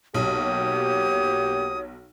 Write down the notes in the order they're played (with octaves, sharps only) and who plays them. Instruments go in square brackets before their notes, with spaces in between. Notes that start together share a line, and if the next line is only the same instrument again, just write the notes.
[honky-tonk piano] B1 [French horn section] A#3 F#4 G4 [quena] C#5 [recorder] D#6